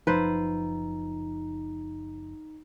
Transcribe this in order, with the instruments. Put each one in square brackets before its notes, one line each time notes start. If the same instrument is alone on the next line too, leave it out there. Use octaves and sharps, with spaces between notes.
[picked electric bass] F#1 F3 [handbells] D#4 [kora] B4 C5